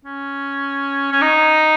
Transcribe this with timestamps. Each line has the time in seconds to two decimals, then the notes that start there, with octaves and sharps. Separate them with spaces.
0.05 C#4
1.12 C#4
1.22 D#4